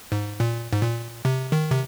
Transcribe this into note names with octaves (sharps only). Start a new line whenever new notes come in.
G#2
A#2
G#2
A#2
C3
D#3
C3